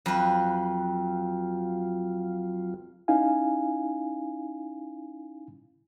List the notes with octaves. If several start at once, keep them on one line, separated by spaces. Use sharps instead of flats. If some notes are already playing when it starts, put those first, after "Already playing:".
F2 F#3 F4 B4
C#4 D#4 E4 F5 G#5